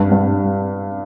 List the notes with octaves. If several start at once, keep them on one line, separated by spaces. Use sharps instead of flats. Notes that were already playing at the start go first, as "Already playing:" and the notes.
Already playing: G2
G2